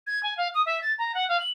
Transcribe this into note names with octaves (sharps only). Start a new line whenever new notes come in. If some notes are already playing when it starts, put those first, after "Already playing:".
G#6
G#5
F5
D#6
E5
A6
A#5
F#5
F5
F#7